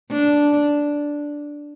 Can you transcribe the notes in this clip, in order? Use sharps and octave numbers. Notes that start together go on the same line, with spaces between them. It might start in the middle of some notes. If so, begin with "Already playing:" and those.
D4